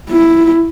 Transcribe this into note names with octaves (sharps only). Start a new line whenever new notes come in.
E4